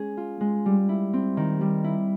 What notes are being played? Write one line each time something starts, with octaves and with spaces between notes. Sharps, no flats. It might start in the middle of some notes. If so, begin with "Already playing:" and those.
Already playing: G#3 C#4 G#4
F4
G#3
G3
E4
C4
D#3
G3
E4